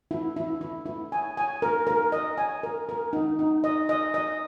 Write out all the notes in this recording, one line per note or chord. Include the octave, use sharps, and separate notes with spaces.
E4
E4
E4
E4
G#5
G#5
A#4
A#4
D#5
G#5
A#4
A#4
D#4
D#4
D#5
D#5
D#5